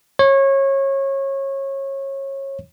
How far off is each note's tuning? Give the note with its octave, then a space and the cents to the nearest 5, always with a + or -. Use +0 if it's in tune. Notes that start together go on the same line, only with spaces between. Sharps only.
C#5 -25